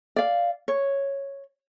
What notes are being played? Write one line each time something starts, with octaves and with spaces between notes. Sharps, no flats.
D5 F5
C#5